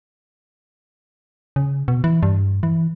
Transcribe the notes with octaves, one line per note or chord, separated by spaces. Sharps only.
C#3
B2
E3
G2
E3